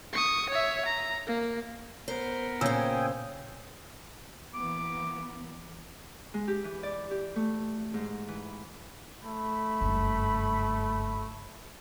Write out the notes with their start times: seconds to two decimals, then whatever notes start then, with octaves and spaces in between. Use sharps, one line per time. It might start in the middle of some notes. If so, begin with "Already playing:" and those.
0.13 C#6 D#6
0.49 C#5 E5
0.85 A#5
1.27 A#3
2.08 B3 A#4 C5
2.61 A#2 C#3 C5 G5 G#5 D#6 E6
4.54 E3 A#3 B3 D6
6.34 G#3
6.48 G4
6.64 E3
6.83 D5
7.11 G4
7.36 A3
7.94 G#2
8.28 E3
9.23 A3 B5
9.81 F#1 G2